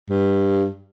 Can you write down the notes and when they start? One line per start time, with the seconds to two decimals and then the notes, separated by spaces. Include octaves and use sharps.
0.10 G2